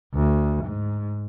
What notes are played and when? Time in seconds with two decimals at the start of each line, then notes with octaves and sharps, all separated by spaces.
0.14 D2
0.64 G#2